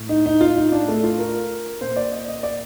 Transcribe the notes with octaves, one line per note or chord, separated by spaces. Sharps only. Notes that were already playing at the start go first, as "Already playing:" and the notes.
Already playing: A2
D#4
D#4
F4
D#4
D4
A3
F4
A#4
A#2 C5
D5
D#5
D#5
D5